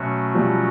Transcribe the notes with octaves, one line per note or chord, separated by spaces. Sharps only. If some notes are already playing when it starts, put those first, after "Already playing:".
Already playing: B2 F#3 A3 C#4 F#4
F3 G3